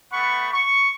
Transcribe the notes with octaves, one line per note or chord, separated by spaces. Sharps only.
A3 B3 F#5 B5 C#6
C#6